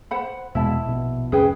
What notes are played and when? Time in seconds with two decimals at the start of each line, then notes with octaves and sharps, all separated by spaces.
0.11 C5 F#5 B5
0.55 E2 B2 G#3 E4 E5 A5
0.86 A#1 B2
1.32 C#2 F#2 C#4 G#4 B4 G5